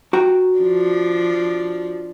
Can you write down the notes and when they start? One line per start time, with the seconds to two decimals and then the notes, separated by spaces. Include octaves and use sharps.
0.13 F#4 G5 A#5
0.59 F3 D4